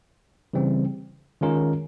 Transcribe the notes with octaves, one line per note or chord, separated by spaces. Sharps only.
C#3 E3 G3 C4
D#3 G#3 C#4 F4 A#4